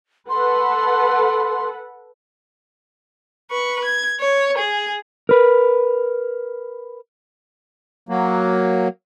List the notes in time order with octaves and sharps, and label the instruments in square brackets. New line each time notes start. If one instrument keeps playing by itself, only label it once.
[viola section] A4 B4 F#5 [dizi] C6
[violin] B4 C#6
G#6
C#5
G#4
[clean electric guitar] A#4 B4
[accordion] F#3 A#3